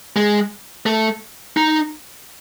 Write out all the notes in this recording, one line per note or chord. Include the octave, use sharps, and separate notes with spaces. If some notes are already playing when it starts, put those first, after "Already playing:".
G#3
A3
D#4